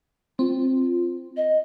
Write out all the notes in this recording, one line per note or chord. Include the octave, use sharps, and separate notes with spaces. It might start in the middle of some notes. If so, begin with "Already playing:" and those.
C4 F4
D#5